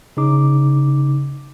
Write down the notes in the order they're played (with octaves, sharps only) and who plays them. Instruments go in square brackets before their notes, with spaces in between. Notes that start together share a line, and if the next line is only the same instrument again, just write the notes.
[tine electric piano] C#3 D#4 D6